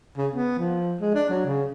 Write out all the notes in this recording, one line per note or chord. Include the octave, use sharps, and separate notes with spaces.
C#3
B3
F3
G#3
D4
F#3
C#3